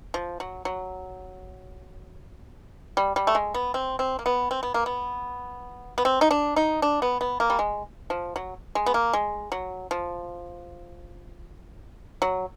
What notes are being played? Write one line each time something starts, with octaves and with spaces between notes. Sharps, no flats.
F3
F#3
F#3
G3
G3
A3
G#3
B3
C4
C4
A#3
B3
C4
B3
A#3
B3
B3
C4
D#4
D4
D#4
D4
B3
B3
A#3
G3
G#3
F3
F#3
G#3
B3
A#3
G#3
F#3
F3
F#3